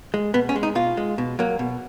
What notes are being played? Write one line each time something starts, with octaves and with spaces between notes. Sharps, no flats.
G#3
B2 B3
C#4
G#3
D#4
B2 F4
G#3
B2
F#3 A#3
B2